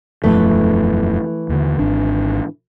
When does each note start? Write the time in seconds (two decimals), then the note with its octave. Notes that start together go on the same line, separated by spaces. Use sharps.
0.24 E1 F#2 E3 F3 A3
1.49 D#2 D3
1.79 G#1 D4